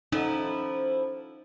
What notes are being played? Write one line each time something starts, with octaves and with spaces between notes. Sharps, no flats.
F3 C#4 D#4 E4 A4 F#5